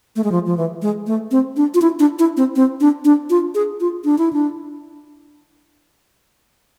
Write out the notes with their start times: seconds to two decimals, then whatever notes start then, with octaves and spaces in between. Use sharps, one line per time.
0.16 A3
0.24 G#3
0.32 F3
0.46 F3
0.58 E3
0.82 G#3
1.07 A3
1.31 C4
1.57 D4
1.74 F4
1.82 E4
1.99 D4
2.19 E4
2.37 C4
2.56 C4
2.81 D4
3.05 D4
3.30 F4
3.55 G#4
3.80 F4
4.05 D4
4.18 E4
4.33 D4